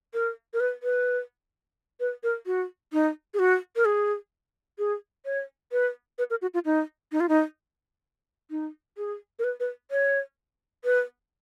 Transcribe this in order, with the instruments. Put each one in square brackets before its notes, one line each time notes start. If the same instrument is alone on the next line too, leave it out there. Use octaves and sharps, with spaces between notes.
[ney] A#4
A#4
B4
B4
B4
A#4
F#4
D#4
G#4
F#4
A#4
G#4
G#4
C#5
B4
B4
A#4
F#4
F4
D#4
D#4
F4
D#4
D#4
G#4
A#4
B4
B4
C#5
B4